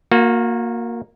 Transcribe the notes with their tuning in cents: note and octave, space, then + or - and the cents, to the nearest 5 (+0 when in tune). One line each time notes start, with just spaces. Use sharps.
A#3 +0 F#4 -35